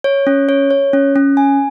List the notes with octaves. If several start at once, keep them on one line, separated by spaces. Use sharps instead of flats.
C#5
C#4
C#5
C#5
C#4
C#4
G#5